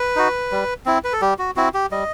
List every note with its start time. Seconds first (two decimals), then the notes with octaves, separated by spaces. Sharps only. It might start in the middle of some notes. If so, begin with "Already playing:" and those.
Already playing: B4
0.16 D#4 F#4
0.52 G3
0.86 C4 E4
1.04 B4
1.13 A4
1.22 G3 G4
1.39 F#4
1.56 C4 E4 F#4
1.74 G4
1.92 G3 D#5